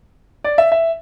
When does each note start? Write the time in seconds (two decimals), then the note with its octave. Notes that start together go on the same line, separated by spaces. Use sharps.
0.44 D5
0.58 E5
0.72 E5